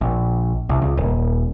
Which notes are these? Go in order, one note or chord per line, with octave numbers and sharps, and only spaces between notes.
A#1
C2
C#2
D#1